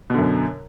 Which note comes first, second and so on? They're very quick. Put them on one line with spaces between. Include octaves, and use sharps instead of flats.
B2 D3 F#2